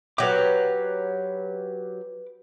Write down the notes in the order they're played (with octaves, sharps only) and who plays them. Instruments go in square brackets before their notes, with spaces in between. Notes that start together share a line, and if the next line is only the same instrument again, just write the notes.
[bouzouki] F#3 G4 [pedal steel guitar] B4 D6